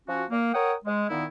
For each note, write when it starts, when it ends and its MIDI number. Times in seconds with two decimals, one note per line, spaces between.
0.07 0.23 53
0.07 0.23 61
0.07 0.23 66
0.30 0.53 58
0.53 0.73 70
0.53 0.73 73
0.53 0.73 78
0.53 0.73 79
0.53 0.73 87
0.85 1.05 56
1.09 1.25 46
1.09 1.25 51
1.09 1.25 59
1.09 1.25 63
1.09 1.25 64